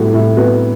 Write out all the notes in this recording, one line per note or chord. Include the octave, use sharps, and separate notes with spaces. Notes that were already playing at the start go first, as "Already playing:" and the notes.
Already playing: A2 G3 B3 E4 F#4 G4
A2 E4
B3 F#4